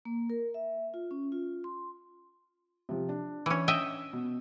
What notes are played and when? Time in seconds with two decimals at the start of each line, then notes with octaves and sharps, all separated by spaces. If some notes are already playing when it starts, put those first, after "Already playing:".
0.05 A#3
0.30 A#4
0.54 E5
0.94 F4
1.11 C#4
1.32 F4
1.64 C6
2.89 C3 F3
3.09 D4
3.46 E3 C#4
3.68 D#5 E5 G5
4.13 B2